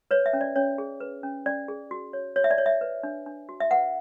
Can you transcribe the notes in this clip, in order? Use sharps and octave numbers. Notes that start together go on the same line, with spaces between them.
B4 C#5
E5
C#4
D5
C#4 C#5
G#4
B4
C#4
C#4 D5
G#4
F#4
C#5
F#4 C#5
E5
D5
C#5
E5
B4
D4
D4
F#4
E5
B4 F#5